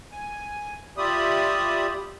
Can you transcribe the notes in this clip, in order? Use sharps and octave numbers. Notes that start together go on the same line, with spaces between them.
G#5
F4 G4 D5 E5 B5 D#6